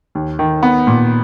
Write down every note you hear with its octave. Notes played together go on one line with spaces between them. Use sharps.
D#2
D#3
B3
A#2